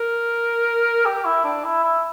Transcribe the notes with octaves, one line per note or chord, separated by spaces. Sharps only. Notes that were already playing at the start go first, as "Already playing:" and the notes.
Already playing: A#4
G4
E4
D4
E4
E4